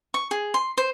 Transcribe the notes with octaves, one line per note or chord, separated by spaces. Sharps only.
C#6
G#4
C6
C5